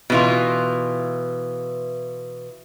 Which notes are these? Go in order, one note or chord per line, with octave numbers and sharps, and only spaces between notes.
B2 E3 F4